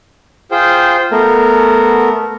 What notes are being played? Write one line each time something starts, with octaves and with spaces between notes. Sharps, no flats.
F4 G#4 C5 G5
A3 B3 A#4